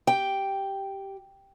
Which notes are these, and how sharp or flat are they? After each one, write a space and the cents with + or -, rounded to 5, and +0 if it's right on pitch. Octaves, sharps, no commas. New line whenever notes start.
G4 -10 G5 +0